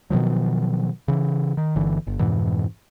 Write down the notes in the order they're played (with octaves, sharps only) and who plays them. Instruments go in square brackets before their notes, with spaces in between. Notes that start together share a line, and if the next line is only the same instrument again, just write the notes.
[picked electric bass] B2 D#3 F3 F#3
C#3 E3
D#3
G1 D3 E3
G1
F2 G#2 B2 E3